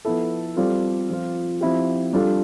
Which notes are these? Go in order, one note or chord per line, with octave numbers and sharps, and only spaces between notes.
F3 B3 E4 A4
G3 C4 F4 A4
F3 C4 F4
F3 C4 E4 G4
G3 D4 F4 A4